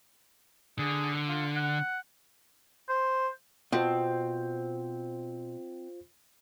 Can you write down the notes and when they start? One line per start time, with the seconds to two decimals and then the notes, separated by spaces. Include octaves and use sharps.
0.79 D3 G#4
1.28 F4
1.56 F#5
2.89 C5
3.73 B2 C4 F4 C5